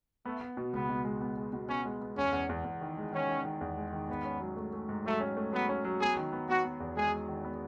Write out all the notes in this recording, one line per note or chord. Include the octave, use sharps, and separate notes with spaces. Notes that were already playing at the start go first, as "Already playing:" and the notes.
A3 B3
B3
B2
C#2 B3
B2
G#3
B3
G#3
B2
B3 C#4
G#3
B3
E2 C#4
E2
E2
E2
D#3
G#3
D#3 C#4
D#3
D#3
E2
G#3
D#3
G#2 B3
C#4
F#3
A3
A3
G#2
F#3 A3
C#4
A3
F#3 B3
C#4
F#3
B3 G#4
D#3
B3
B3 F#4
B3
E2
G#3 G#4
G#3
D#3
B3